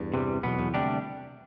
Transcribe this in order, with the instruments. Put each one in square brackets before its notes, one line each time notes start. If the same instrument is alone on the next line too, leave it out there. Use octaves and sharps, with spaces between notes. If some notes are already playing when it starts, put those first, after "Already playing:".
Already playing: [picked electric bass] E2 G2
[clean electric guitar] C3 E3 G3
[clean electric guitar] B1 B2 B3 [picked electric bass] E2
[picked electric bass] E2
[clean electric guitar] D2 C3 G3 D4 G4